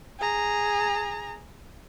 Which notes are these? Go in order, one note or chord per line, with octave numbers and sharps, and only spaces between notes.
G#4 A#5